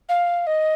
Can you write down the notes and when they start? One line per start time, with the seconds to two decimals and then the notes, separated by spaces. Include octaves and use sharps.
0.09 F5
0.47 D#5